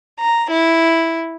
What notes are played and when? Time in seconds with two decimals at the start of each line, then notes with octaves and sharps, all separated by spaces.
0.19 A#5
0.50 E4